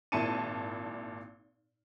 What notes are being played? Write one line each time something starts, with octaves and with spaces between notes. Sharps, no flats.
G#1 A#2 E4 A5 C#7 D#7